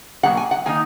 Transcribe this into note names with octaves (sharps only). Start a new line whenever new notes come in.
B2 F#3 A#3 F#5
G#5
F#5
D#3 A#3 D#4 G#5